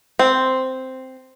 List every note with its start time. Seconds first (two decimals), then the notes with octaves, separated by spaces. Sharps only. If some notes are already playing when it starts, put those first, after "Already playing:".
0.19 C4